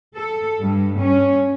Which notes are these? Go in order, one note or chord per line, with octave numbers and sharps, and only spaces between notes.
A4
G2
C#4